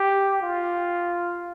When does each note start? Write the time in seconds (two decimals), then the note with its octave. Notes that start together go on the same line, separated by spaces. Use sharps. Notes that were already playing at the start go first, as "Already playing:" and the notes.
Already playing: G4
0.42 F4